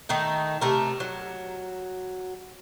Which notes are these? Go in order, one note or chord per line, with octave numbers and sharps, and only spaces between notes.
D#3 A3 D#4
C3 A3 A#4
F#3